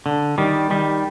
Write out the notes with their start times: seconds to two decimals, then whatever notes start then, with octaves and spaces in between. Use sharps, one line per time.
0.06 D3
0.38 D#3 G3
0.70 D#3 G3